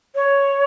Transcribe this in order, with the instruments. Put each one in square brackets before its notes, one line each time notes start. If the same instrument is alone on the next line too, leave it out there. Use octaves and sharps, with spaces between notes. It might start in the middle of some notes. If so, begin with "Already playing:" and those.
[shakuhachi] C#5